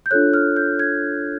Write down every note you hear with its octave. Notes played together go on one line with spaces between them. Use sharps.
G6
D4 F4 A4 C#5 F#6
F6
G6
G#6